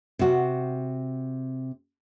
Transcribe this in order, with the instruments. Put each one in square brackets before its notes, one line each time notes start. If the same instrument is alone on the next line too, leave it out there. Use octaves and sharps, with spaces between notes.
[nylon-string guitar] C3 F#4